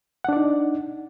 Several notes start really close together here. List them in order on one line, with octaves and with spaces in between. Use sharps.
F#5 D4 D5 D#4